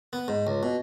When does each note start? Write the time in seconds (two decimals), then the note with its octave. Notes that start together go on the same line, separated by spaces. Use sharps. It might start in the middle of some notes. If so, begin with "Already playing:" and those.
0.13 B3
0.28 G#2
0.47 C#2
0.63 B2